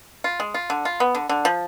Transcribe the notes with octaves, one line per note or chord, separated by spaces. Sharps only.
F4
G#3
F4
D3
F4
B3
D3
D3
F3